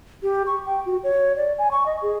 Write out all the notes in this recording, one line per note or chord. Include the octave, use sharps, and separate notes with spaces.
G4
C#6
G5
F#4
C#5
D5
G#5
C#6
D#5
G#4